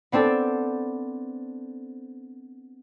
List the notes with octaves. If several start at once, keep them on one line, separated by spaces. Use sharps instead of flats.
B3 C4 D4 A4